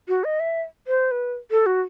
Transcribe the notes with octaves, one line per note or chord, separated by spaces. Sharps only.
F#4
D#5
E5
C5
B4
A4
F#4